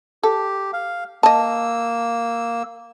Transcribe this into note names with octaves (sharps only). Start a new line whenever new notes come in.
G4 A4
F5
A#3 D#5 A5 E6